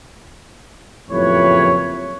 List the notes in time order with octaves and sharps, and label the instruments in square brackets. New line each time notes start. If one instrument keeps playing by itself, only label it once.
[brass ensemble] F#1 F2 A2 G4 B4 C#5